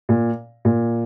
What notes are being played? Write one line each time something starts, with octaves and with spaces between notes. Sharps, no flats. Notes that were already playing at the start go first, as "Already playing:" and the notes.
A#2
A#2